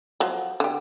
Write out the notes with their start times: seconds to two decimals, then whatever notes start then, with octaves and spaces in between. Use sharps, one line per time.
0.20 F3 F#3
0.60 D3 G4